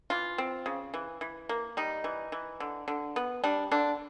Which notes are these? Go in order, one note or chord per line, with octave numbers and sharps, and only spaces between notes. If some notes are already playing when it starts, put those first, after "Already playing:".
E3 F4
C4
C#3
E3
E3
A#3
G3 D#4
E3
E3
D3
D3
B3
G3 D4
D3 D4